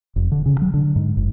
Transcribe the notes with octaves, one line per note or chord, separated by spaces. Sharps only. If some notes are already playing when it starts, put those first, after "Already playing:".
F1
D3
C#3
F#3
D3
G#2
F#1